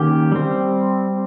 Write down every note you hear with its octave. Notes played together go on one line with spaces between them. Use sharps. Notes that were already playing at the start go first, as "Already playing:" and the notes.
Already playing: D#3 A#3 C#4 G4
G3 C4